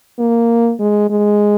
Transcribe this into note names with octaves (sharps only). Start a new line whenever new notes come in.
A#3
G#3
G#3